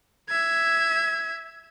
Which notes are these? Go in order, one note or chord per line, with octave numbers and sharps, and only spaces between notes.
E5 G#6